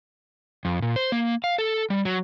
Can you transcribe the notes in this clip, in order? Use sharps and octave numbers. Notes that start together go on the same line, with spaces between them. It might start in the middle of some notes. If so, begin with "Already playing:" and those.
F2
A#2
C5
A#3
F5
A4
G3
F#3